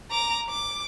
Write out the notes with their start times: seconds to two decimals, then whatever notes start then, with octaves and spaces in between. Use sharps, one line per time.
0.11 A#5 D6
0.49 D6